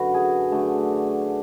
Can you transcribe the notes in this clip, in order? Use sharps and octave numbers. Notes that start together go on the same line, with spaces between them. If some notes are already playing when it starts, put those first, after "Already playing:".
Already playing: F#2 D3 F#4 B4
G#4
D3 A3 D4